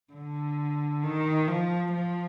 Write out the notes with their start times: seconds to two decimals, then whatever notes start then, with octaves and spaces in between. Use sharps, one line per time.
0.13 D3
1.03 D#3
1.48 F3
1.93 F3